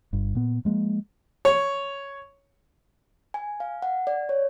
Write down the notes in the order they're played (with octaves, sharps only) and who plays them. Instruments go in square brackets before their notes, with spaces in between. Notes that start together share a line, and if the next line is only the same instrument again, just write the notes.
[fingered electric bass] G1 G2
A#2 B3
F3 G#3 A#3
[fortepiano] C#5
[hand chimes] G#5
F5
F#5
D5
C#5